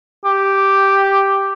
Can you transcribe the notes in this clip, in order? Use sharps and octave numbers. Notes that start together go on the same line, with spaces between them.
G4